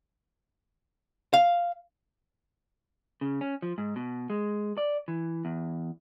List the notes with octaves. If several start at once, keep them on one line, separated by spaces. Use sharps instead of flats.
F5
C#3
C#4
F3
G#2
B2
G#3
D5
E3
E2